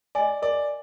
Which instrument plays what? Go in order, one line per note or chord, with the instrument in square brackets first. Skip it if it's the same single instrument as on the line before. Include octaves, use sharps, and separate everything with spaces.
[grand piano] D5 [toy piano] D#5 G#5
[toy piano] A#4 [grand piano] D5